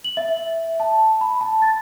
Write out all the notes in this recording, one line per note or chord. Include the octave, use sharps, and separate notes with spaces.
F#7
E5
A5
B5
A5
A6